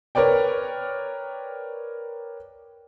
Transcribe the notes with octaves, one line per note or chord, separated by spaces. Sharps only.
A#4 B4 C#5 D5 G5